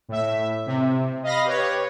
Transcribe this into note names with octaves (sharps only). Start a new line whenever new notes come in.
A2 E5
C3
D#5 F5 B5 A#6
G4 B4 C#5